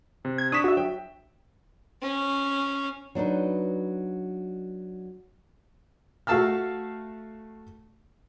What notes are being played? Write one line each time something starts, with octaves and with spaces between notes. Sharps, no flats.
C3
G#6
D4 C#6 D#6 B6 E7
D4 F#4 E5
F#3 G5
C#4
F#3 D4 D#4 B4
A3 F#4 F5 A5 E6 F6